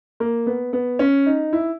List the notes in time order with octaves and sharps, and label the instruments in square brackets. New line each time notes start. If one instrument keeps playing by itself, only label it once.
[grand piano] A#3
B3
B3
C#4
D#4
E4